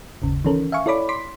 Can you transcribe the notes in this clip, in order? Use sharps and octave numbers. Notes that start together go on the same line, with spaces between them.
G1 D#2 C#3
D#3 E3 C#4 A4 A#4
E5 F5 G#5 C#6
E4 A4 C#5 D5 B5 D6
C6 D6 B6